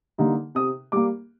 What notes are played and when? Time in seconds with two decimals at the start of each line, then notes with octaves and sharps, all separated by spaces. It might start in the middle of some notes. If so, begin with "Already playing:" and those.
0.18 D3 G3 A#3 D#4
0.55 C3 D#6
0.92 G3 A#3 D6